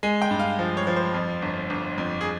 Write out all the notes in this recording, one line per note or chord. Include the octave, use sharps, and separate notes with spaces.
G#3 G#5
G5
G2
F5
F3
C#5
F3
C5
F2
G1
G1
F2
G#4